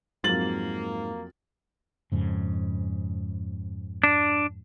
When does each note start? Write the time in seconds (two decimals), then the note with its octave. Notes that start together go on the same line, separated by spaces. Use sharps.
0.24 F2 G#2 F#3 A#3 A6 F#7
2.12 F2 G#2 C#3
4.04 D4